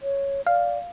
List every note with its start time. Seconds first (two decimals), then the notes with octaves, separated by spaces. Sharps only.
0.01 C#5
0.47 D5 F5